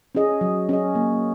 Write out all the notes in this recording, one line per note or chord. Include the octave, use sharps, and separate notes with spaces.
C#4 G#4 D#5
F#3
C#4 G#4 D#5
A#3